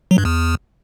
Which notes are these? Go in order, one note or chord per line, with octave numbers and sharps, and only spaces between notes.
F#3
G2
E2